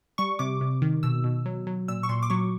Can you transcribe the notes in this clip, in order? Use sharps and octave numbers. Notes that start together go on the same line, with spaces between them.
G3 C#6
C3 D6
C3
D#3
B2 E6
B2
F#3
F#3
A#2 E6
C#6
A#2 C6
D6
F#3 C#6